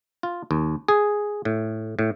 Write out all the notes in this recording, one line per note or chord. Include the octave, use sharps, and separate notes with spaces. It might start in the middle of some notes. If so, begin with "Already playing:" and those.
F4
D#2
G#4
A2
A2